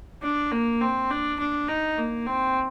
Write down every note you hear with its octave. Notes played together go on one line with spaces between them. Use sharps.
D4
A#3
C4
D4
D4
D#4
A#3
C4